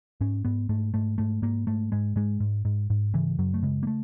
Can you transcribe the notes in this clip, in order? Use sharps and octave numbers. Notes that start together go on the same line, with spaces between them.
G#2 C#4
G#2 B3
G#2 A3
G#2 A3
G#2 A3
G#2 A#3
G#2 A3
G#2 G#3
G#2 G#3
G#2
G#2
G#2
C#3 E3
F#2 F#3
A3
C#3 G#3
A#3
A3